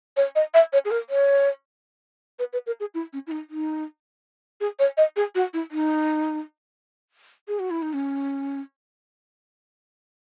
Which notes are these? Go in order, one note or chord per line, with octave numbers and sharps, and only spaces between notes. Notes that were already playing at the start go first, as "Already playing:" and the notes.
C#5
D#5
E5
C#5
G#4
A#4
C#5
B4
B4
A#4
G#4
E4
C#4
E4
D#4
D#4
G#4
C#5
D#5
G#4
F#4
E4
D#4
G#4
F#4
E4
D#4
C#4